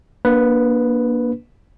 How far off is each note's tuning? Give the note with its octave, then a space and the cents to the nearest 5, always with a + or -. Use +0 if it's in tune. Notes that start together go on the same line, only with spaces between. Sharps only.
A#3 +25 D4 +0 B4 +0